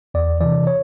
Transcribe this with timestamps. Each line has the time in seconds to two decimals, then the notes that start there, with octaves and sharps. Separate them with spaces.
0.14 E2 D5
0.41 C3 E3 D5
0.67 C#5